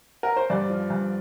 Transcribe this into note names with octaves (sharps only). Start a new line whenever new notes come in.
A#4
C5
G2 D5
F3
G2